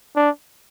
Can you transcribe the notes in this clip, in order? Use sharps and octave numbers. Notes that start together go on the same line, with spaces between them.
D4